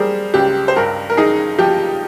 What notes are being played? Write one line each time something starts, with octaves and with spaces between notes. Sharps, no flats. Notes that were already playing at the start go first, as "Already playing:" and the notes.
Already playing: G3 G#4 A#4 C5
C#2 G4
C5
G2 A#4
A#4
D#4 G#4
F3 G4